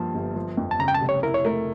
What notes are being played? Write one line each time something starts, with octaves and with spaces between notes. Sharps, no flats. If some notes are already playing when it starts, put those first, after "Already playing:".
Already playing: G2 F3 A#3 A5
G1
F3
F2
A5
C#3 A#5
G5
A5
F1
C#5
E4 A#4
C#5
A3 A#4